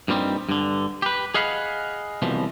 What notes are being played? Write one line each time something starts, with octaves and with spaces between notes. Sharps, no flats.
G2 A#2 G3 C4 D#4
G2 D3
G4 B4
G#4 D#5 F5 F#5 B5
C2 B2 E3 F3